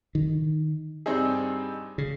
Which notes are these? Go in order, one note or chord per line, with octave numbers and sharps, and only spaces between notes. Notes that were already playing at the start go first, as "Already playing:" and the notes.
D#3
G2 G3 C4 D#4 G#4
C#3